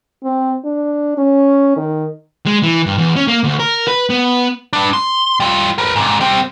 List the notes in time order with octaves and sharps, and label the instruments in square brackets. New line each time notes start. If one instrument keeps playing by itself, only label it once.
[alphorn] C4
D4
C#4
D#3
[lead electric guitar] G#3
E3
G2
E2
C#4
A#3
D2
A#4
B4
B3
D4 B4
C6
G3 F4
A#4 B4
G#2 C3
G3 C4